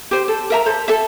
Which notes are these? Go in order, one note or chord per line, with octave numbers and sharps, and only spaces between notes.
G4 C5
A4
A#4 E5 A#5
A4 C5
A4 E5